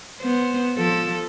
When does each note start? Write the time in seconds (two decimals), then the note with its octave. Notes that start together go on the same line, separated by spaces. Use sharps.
0.20 B3 C5
0.77 F3 A4